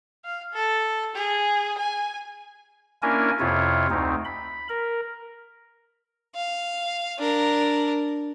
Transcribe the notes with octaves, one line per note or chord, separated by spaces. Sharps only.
F5
A4
G#4
G#5
A#3 C#4 D4 E4 A#4 G#5
F2 C3 E4 F4 C#5
D2 C4 D#4
B5
A#4
F5
D4 A#4